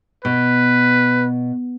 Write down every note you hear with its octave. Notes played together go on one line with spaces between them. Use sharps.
B2 B4